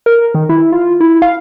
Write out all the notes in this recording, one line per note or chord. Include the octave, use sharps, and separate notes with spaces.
A#4
D#3
E4
F4
E4
F5